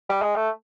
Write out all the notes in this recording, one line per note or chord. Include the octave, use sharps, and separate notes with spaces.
G3
G#3
A3